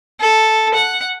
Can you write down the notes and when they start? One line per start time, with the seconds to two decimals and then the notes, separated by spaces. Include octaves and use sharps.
0.20 A4
0.74 F#5